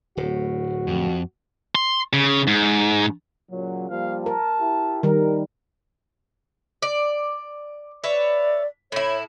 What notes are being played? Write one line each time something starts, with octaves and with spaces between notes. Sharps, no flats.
D1 A2 F#4
F2
C6
C#3
G#2
A#2 C#3 F#3
F3 G3 A#3 F5
A#4 A5
E4 G4
D#3 G3 A#4
D5
B4 C#5 D5 E5
A2 E4 C#5